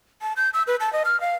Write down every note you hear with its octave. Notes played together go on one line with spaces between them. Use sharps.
A5
G6
E6
B4
A5
D#5
F6
F5